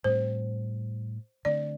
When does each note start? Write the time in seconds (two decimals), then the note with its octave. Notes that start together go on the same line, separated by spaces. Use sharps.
0.04 A2 G3 C4 C5
1.45 D3 A3 C4 D5